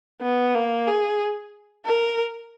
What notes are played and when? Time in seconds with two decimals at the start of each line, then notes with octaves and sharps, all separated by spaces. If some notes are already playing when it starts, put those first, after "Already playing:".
0.22 B3
0.55 A#3
0.87 G#4
1.85 A#4